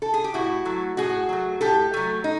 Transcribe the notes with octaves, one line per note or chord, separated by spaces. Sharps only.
A4
G#4
G4
A2 E4 F#4
F#3 A3
A2 F#4 G#4
F#3 A3
A2 G4 A4
F#3 A3
D#4